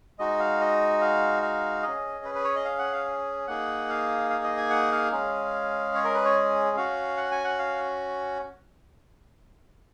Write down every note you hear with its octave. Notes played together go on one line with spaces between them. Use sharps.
G#3 D#4 F#4 D#5
F5
D#5
F5
F5
C#4 G#4 D#5
B4
B4
C#5
D#5
F5
F#5
F5
A#3 D#4 G#4 F#5
F5
F5
D#5
G#5
F#5
F5
G#3 C#4 G#4
C#5
A#4
B4
C#5
C#4 F#4 F5
F#5
G#5
F#5
F5